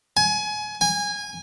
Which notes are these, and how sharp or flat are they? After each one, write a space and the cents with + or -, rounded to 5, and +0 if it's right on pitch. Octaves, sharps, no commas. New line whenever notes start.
G#5 +25
G#5 -20